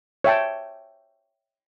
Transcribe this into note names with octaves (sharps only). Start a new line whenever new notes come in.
C#5 E5 G5 A5